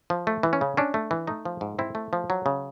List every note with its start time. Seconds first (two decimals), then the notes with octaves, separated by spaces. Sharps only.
0.10 F3
0.27 A3
0.43 E3
0.53 C#4
0.61 C#3
0.77 C#4 D4
0.94 A3
1.11 E3
1.27 A3 D#4
1.45 F3
1.61 G#2
1.79 C4 E4
1.95 A3
2.13 F3
2.30 F#3
2.46 C#3